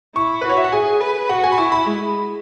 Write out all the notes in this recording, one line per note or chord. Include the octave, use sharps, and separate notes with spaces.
E4 C#6
B4
F#4
C#5
E5
F#5
G#4 G#5
B4
F#4 F#5
G#5
B5
E4 C#6
B5
G#3